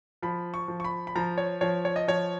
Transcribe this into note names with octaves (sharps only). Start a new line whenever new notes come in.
F3 B5
C#6
F3
C#6
B5
B5
F3 A#5
C#5
F3 C#5
C#5
D#5
F3 C#5